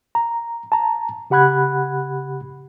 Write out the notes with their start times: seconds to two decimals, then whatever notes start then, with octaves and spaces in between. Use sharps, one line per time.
0.15 A#5
0.72 A5 A#5
1.30 C#3 G4 F#5 B5 F#6 G#6